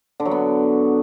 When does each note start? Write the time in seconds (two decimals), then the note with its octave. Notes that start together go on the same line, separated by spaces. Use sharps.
0.20 D3
0.25 F#3
0.31 B3